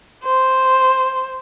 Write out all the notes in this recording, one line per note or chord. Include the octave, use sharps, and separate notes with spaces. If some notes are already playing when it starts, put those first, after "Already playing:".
C5